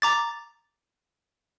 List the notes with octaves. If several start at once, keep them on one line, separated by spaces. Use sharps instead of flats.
A#5 D6 A6